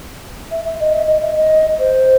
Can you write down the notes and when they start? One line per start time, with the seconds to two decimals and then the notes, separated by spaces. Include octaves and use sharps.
0.51 E5
0.65 E5
0.80 D#5
0.93 E5
1.08 D#5
1.22 E5
1.36 D#5
1.79 C5